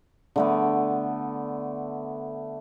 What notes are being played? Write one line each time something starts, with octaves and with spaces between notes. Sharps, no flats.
D3 A3 B3